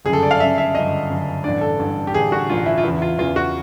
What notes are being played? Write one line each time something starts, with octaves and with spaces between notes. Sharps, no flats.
G1 F#2 C#3 G#4
A4
D5
F5
G1 F#2 C#3 E5
E5
G1 F#2 C#3 D#5
G1 F#2 C#3
A1 G2 D3 D5
A4
A1 G2 D3
G4
A1 G2 D3 G#4
F#4
A1 G2 D3 F4
E4
F4
E2 C#3 E3 E4
F4
E2 C#3 E3 F4
F#4